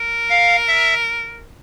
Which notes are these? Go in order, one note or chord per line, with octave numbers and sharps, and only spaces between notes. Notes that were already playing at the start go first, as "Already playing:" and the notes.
Already playing: A#4
F5
E5